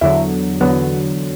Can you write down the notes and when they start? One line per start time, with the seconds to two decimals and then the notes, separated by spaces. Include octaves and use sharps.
0.01 E2 D3 F#3 E4
0.61 E2 D3 F#3 B3